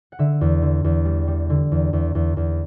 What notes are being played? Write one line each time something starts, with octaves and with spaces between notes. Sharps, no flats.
F#5
D3 E5
E2
D3
E2
G3
G3
D3
E2
E2
E2
E2